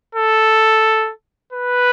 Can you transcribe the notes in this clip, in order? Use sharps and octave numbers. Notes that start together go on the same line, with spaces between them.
A4
B4